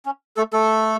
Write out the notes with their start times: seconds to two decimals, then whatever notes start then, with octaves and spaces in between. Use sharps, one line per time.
0.06 C#4
0.37 A3 A4
0.53 A3 A4